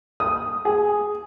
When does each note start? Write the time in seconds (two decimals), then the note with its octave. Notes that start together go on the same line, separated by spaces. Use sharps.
0.20 D#6
0.65 G#4